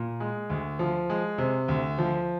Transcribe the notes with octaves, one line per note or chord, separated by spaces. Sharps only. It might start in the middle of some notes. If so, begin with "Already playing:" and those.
Already playing: A#2
G#3
D2
F3
G#3
C3
D2
F3